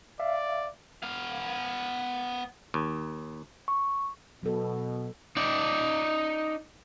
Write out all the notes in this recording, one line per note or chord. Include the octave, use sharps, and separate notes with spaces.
D5 E5 F5
B3 F5
D#2
C#6
B2 F#3 A4
D#4 D5